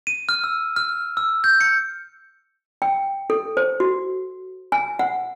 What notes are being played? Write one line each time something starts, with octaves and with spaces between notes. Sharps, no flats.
D#7
F6
E6
F6
E6
G6
C#7
G5
A4
C5
F#4
G#5
F#5